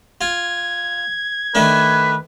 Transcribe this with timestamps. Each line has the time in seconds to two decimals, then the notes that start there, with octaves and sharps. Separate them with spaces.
0.21 F4 G#6
1.55 D#3 A3 D4 B4